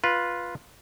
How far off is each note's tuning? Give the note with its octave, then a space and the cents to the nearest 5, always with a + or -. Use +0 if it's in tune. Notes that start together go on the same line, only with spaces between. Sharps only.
F4 +0 B4 -10